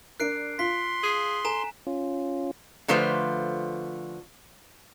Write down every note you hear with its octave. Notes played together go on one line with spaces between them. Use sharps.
D4 A#4 F#6 C7 D7
F4 C6 B6
G#4
A4 G#5 A#5 E7
C#4 F4
D3 F3 A3 F4 B4 C5